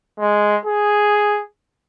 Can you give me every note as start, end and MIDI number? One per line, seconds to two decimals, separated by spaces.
0.20 0.57 56
0.66 1.41 68